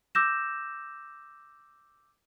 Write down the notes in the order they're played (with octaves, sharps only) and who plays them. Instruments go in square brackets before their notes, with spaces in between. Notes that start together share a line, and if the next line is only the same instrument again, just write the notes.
[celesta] D6 E6 G6 A#6 E7